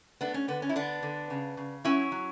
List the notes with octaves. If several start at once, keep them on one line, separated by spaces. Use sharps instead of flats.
A3 B3 D4
C#4
D3 B3
C#4
E4
D3 B3 D4
D3
C#3
C#3
F#3 C#4 E4
F#3